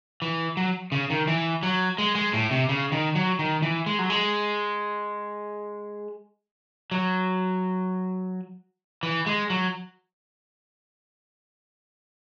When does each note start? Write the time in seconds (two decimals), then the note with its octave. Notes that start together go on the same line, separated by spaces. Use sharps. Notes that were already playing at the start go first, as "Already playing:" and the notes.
0.22 E3
0.57 F#3
0.92 C#3
1.10 D#3
1.28 E3
1.63 F#3
1.98 G#3
2.15 G#3
2.33 A2
2.51 C3
2.69 C#3
2.92 D#3
3.15 F#3
3.39 D#3
3.63 E3
3.86 G#3
3.99 F#3
4.10 G#3
6.91 F#3
9.03 E3
9.26 G#3
9.50 F#3